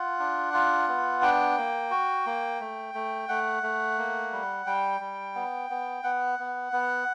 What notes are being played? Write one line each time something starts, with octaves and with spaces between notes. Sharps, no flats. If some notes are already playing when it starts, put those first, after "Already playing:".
Already playing: F4 F#5
D4
F4
B3
D4 G5
A#3
F#4
A#3
A3
A3
A3 F#5
A3
A#3
G3
G3 G5
G3
B3
B3
B3 F#5
B3
B3